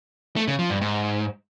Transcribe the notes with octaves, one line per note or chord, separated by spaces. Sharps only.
A3
C#3
F3
G2
G#2